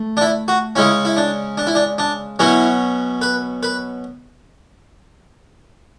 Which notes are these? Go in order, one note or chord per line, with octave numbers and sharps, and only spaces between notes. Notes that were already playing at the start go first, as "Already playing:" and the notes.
Already playing: A3
D4
E4
F#4
C#3 G#3 C#4 E4
E4
D4
D4
E4
D4
D4
B2 F#3 C#4 E4
B4
B4